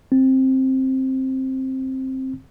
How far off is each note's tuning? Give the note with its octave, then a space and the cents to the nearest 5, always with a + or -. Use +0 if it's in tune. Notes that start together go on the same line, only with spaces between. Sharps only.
C4 +10